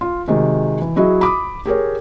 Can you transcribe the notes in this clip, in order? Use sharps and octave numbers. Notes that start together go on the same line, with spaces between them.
F4
C3 D#3 G#3 F#4
E3
F#3 E4 F#4 G#4 D#5
B5 D6 D#6
G4 G#4 A#4 C#5